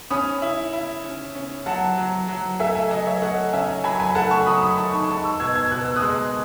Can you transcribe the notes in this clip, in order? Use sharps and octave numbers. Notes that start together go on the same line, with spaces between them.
C#4 B5 D#6
E4
E4
C#4
C#4
F#3 F#5 A5
F#3
F#3
A3 E5 G#5
E5 G#5
F#3 D#5
C#5 E5
A3 D#5 F#5
C#4 E5 G#5
F#3 G#5 B5
G#5 B5
A3 F#5 A5
A5 C#6
F#3 B5 D#6
B5 D#6
D#3 A5 C#6
G#5 B5
G#3 A5 C#6
C#6 E6
B2 E6 G#6
E6 G#6
B2 F#6
E6
D#6 F#6
G#3